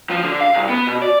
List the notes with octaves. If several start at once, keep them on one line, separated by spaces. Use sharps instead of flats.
F3
D3
F5
C2
B3
B2
D5